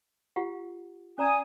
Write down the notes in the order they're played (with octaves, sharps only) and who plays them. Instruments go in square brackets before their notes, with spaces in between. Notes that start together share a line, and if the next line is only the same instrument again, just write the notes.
[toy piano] F4 G4 F#5
[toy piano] C#4 D5 A#5 [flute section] G#5 D#6